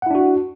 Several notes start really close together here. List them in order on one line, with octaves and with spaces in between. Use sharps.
F#5 E4 D4 F#4